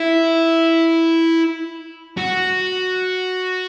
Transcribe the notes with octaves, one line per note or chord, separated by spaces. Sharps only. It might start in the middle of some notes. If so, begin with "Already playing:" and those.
Already playing: E4
F#4